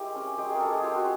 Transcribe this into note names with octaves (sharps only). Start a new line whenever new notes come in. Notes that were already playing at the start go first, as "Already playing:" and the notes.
Already playing: G#3 E4 G4 A#4 E5
C#4
G#3 G4
G#4
A#4
G#3 A4
G#4
F4 G4
F#4